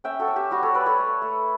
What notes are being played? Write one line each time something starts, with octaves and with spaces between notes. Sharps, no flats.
C#4 E5 G5
F#4 A4
C#4
G4
G3 F#4
A4 C#5
G3 B4 D5
A4 C#5
A3
A3